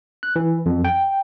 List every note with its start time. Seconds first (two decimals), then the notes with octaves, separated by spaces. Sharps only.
0.23 F#6
0.36 E3
0.66 F2
0.85 G5